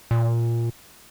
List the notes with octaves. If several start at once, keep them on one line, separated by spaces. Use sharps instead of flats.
A#2